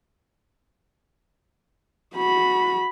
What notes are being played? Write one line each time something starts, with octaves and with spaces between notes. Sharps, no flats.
F#4 B5